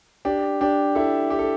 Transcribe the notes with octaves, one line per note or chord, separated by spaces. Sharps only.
D4 G4
D4 G4
E4 A4
G4
A4